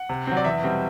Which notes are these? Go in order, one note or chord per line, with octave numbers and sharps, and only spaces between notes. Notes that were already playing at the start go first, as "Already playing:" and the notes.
Already playing: F#5
C3
F#3 C4
D5
E2 E5
B2 G3 C4